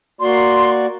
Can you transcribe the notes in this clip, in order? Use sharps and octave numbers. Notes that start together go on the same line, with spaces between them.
A#3 F#4 D5 C6